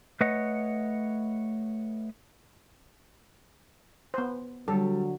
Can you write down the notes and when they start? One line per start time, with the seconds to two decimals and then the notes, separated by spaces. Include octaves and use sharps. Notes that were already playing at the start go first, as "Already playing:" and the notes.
0.21 A3 B4 C#5 D#5 F#5
4.14 B3 C5
4.68 D3 F#3 G3 A4